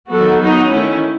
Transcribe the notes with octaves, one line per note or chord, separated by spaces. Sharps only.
D#3 F#3 B3 F#4 A4
F#3 B3 D#4 F#4
D#3 A3 C#4 E4